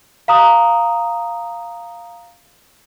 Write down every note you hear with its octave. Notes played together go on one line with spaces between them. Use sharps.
F5 A#5 D#6